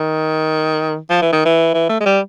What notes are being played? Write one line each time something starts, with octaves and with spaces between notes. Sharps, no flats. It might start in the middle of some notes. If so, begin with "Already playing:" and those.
Already playing: D#3
F3
E3
D#3
E3
E3
A3
G#3
G3